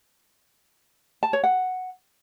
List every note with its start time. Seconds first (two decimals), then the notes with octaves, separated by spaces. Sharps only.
1.23 A5
1.33 C#5
1.44 F#5